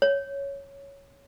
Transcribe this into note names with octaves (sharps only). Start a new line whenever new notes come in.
C#5